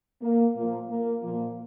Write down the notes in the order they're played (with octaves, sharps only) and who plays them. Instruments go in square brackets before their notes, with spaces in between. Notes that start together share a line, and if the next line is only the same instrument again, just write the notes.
[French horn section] A#3
A#2 F3 A#3
A#3
A#2 F3 A#3